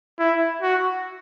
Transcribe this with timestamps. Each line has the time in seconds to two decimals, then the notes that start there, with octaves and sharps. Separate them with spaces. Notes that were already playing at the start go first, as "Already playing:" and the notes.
0.19 E4
0.62 F#4